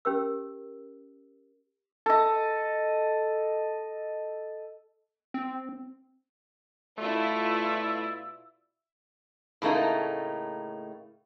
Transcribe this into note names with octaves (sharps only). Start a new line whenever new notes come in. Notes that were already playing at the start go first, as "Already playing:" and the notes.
C#4 G4 A#4 E6
A4 D#5
C4
B2 A3 E4 F4 D5 E6
A2 C#3 A3 A#3 D#4